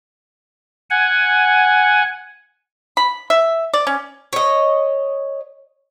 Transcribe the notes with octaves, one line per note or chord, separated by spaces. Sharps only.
F#5 G#5
B5
E5
D5
C#4
C#5 D#5